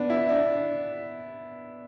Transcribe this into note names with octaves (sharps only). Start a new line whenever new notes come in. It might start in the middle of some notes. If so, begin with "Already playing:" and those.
Already playing: B3 D4
E4
D4